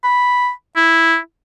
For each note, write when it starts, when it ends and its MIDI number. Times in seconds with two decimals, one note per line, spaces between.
0.04 0.50 83
0.76 1.17 64